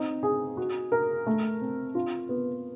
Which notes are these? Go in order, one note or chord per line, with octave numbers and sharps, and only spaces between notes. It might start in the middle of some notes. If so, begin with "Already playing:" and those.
Already playing: C4 D#4
G#4
F#4
A#4
A3
C4
F4
B3